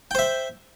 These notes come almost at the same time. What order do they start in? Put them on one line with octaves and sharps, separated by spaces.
G5 C5 E5